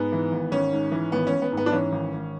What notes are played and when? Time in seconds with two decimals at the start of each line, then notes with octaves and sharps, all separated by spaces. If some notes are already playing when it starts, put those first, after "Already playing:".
Already playing: G#2 B3
0.12 E3
0.32 G#1
0.51 G#1 C#4
0.73 G#2
0.92 E3
1.12 G#1 B3
1.27 C#4
1.32 G#1
1.42 B3
1.52 G#2
1.57 B3
1.66 D4
1.72 E3 C#4
1.92 G#1
2.13 G#1